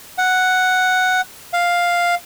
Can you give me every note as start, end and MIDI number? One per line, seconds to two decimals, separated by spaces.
0.18 1.21 78
1.53 2.15 77